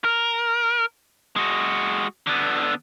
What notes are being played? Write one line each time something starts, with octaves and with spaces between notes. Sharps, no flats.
A#4
G#3 F#4
D3 B3